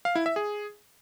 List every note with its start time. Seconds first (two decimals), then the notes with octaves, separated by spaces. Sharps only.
0.05 F5
0.15 E4
0.26 E5
0.36 G#4